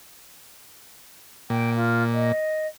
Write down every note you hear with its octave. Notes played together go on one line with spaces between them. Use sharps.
A#2 G5
F4
D#5